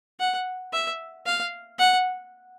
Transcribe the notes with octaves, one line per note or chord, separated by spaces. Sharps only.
F#5
E5
F5
F#5